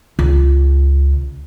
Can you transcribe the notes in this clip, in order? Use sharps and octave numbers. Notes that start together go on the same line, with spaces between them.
C#2